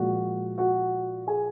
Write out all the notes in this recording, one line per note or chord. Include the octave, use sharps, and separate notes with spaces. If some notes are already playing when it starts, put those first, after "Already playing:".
Already playing: A#2 F3 G#3 F#4 F#5
F#4 F#5
G#4 G#5